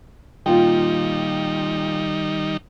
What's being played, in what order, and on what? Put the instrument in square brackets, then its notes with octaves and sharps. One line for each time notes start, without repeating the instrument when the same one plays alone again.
[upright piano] A#2 F4 G5 [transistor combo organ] D#3 G3 D#4